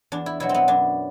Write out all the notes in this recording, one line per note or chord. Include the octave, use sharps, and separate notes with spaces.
E2 D4
E4
B2 F#3 E4
C4
B3
F#2 D4